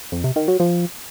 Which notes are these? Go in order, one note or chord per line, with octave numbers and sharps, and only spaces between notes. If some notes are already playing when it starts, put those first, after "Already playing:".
F2
C3
D#3
F#3
F3